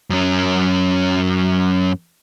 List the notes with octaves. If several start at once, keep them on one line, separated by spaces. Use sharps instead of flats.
F#2 C#4